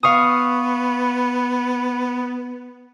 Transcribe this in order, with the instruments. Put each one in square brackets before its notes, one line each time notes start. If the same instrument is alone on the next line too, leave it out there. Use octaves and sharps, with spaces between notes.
[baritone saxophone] B3 [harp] F5 C#6 D#6